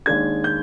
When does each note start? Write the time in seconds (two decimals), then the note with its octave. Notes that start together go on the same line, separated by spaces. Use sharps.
0.06 D#2 D#3 G#3 D4 G#6
0.44 G6